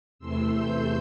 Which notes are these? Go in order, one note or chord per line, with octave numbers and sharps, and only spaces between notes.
E2 C3 E3 A3 C6 E6
E6 G6